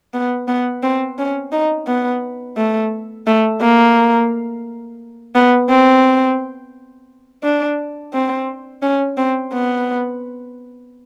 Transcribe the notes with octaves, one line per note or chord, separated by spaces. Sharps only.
B3
B3
C4
C#4
D#4
B3
A3
A3
A#3
B3
C4
D4
C4
C#4
C4
B3